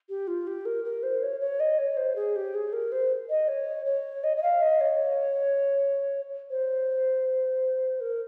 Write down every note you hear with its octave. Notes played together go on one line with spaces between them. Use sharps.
G4
F4
G4
A#4
A#4
C5
C#5
C#5
D#5
C#5
C5
G#4
G4
G#4
A#4
C5
D#5
C#5
C#5
D#5
D#5
F5
D#5
C#5
C5
A#4